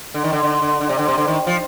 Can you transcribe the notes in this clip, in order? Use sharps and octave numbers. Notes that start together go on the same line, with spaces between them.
D3
D#3
D3
D3
D3
D3
C3
D3
C3
D3
D#3
F3